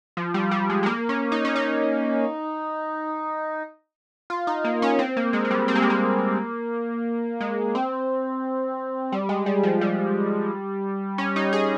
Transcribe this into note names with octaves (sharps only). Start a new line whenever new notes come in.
F3
G3
G3
G#3
G#3
A#3
C#4
D#4
C#4
D#4
F4
D#4
A#3
C#4
C4
A#3
G#3
G#3
G3
C4
A#3
G#3
A#3
G#3
C4
G3
G#3
G3
F3
G3
C#4
D#4
G#4